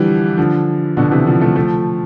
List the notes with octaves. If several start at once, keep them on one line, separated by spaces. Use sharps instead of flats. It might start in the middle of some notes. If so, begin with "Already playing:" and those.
Already playing: D3 E3 F3 G3
D3 F3
B2 D3
C3 E3
D3 F3
F3 A3
F3 A3